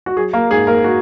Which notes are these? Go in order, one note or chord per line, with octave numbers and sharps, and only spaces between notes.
F#4
F#3 G#4
A#3 A#4
G#2 G#4
A#3 A#4
F#4